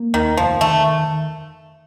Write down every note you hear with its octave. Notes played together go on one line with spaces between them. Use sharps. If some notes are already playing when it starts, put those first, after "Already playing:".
Already playing: A#3
D#2 D#3
F1 F3
D#3 A3